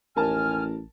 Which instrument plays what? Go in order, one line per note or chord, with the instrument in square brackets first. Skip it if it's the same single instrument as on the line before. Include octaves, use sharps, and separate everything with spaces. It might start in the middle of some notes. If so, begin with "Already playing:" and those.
[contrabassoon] A1 [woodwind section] D#2 G#5 F6 [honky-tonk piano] A#4 A5